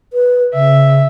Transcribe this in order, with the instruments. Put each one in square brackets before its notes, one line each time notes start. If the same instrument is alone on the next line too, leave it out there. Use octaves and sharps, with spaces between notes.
[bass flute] B4
[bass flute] C#3 [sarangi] E5